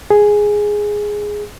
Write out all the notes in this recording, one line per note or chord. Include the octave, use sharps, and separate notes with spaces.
G#4